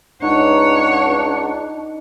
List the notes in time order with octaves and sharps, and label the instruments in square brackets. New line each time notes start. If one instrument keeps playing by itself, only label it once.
[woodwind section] C#2 F#5 [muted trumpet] D4 [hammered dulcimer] D#4 [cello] C#5